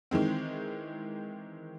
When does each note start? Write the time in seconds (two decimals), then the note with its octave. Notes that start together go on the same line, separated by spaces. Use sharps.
0.11 D#3 E3 G#3 C4